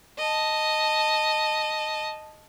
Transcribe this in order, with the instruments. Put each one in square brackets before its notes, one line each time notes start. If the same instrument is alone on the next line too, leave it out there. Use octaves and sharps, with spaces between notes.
[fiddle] D#5 A5